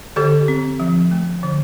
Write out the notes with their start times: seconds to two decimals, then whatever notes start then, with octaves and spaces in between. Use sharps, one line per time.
0.16 D3 G4 A4
0.48 C4
0.80 F3
1.11 A3
1.43 D3